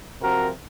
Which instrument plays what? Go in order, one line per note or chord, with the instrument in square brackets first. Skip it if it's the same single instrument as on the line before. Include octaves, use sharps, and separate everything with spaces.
[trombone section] C3 F3 C4 F#4 A#4